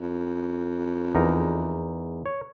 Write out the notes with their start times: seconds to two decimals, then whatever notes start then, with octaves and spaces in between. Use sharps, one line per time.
0.01 F2
1.15 E2 D#4 A#4
2.26 C#5